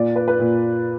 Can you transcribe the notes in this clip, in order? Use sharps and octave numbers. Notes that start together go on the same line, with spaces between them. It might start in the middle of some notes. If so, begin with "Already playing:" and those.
Already playing: A#2 D5
B4
B4
A#2